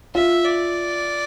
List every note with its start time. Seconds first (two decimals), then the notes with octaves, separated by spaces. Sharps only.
0.15 F4 E5
0.45 D5